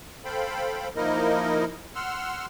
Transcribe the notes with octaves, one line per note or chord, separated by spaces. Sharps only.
A4 C5 F5 G5 B5
F3 A#3 D#4 E4 A#4 D#5
F#5 C6 E6 F6